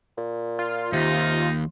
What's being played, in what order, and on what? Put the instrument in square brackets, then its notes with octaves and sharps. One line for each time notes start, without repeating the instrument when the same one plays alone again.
[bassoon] A#2
[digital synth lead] F4
[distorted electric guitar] D#2 [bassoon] C3 [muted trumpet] D#4